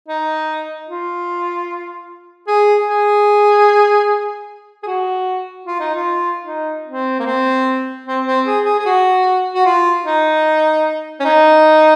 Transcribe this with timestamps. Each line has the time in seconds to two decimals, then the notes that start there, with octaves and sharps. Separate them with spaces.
0.08 D#4
0.88 F4
2.48 G#4
2.87 G#4
4.83 G#4
4.87 F#4
5.66 F4
5.80 D#4
5.94 F4
6.46 D#4
6.87 C4
7.20 A#3
7.26 C4
8.07 C4
8.27 C4
8.45 G#4
8.65 G#4
8.79 G#4
8.85 F#4
9.55 F#4
9.66 F4
10.05 D#4
11.20 C#4
11.25 D#4